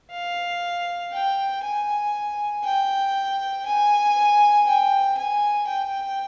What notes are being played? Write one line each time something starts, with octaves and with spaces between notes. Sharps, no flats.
F5
G5
G#5
G5
G#5
G5
G#5
G5